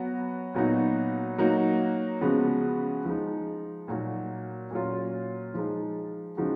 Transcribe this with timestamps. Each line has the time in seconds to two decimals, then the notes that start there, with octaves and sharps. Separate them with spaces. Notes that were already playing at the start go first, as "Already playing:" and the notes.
Already playing: F#3 B3 F#4
0.54 A#2 F#3 B3 D#4 F#4
1.38 F#3 A#3 D#4 F#4
2.21 C#3 F3 G#3 B3 F#4
3.05 F3 G#3 D#4
3.88 A#2 F#3 A#3 D#4 F#4
4.71 A#2 F#3 C#4 F4
5.54 F3 G#3 D#4
6.37 C#3 F3 G#3 D#4 F#4